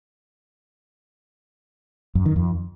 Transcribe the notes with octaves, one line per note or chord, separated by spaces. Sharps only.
F#2
D#3
F2